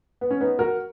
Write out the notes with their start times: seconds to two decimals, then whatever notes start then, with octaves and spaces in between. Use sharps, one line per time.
0.21 B3
0.31 C#4
0.41 B3 D#4
0.59 F#4 A#4